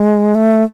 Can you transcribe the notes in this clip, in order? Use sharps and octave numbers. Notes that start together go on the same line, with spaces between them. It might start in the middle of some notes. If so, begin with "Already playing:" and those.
Already playing: G#3
A3